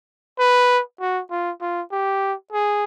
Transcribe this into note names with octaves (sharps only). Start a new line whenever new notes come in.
B4
F#4
F4
F4
G4
G#4